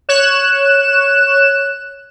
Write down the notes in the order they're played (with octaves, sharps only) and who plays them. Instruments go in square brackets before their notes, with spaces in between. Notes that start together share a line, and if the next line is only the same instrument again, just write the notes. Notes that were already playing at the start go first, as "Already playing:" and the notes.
[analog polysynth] C#5 F#6 E7